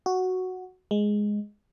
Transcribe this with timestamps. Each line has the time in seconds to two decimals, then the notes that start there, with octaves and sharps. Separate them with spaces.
0.06 F#4
0.91 G#3